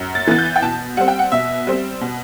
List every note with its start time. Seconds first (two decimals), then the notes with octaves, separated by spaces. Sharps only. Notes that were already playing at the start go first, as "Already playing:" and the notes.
Already playing: F#2
0.15 A6
0.27 E3 B3 A6
0.38 G6
0.56 G5
0.62 B2 A5
0.97 G3 C4 F#5
1.08 G5
1.19 F#5
1.32 B2 E5
1.67 G3 C4
2.01 B2